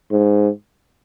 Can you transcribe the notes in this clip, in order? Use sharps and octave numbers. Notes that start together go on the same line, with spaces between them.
G#2